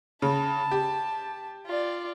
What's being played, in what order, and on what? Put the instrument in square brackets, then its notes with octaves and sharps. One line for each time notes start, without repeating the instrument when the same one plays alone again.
[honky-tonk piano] C#3 [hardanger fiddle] A5
[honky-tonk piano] G4
[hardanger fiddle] F4 D5